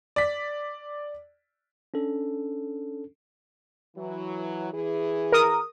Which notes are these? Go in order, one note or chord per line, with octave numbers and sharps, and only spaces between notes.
D5 B6
C#4 D4 A4
E3 F#3
E3 G#4
A#4 D#6